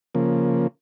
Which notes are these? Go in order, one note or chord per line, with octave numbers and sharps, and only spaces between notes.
C#3 F3 A#3